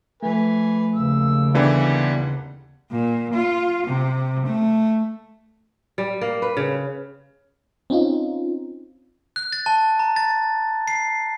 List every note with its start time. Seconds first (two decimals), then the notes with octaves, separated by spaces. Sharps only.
0.23 F3 A3 B4 G#5
0.96 D#2 C#3 E6
1.55 D3 E3 G3 B3 G4 D5 F#5
2.91 A#2
3.34 F4
3.86 C3
4.45 A3
5.98 G3
6.21 A#3
6.42 B4
6.57 C#3
7.90 C4 C#4 D#4 F4
9.36 F#6
9.53 A6
9.66 A5
9.99 A#5
10.16 A6
10.88 C7